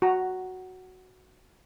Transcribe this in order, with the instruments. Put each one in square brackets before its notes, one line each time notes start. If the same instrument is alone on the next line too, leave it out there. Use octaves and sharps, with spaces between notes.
[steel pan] F#4 A#5